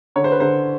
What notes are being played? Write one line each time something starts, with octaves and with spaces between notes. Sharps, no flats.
D3 C#5
C5
B4
D3 C5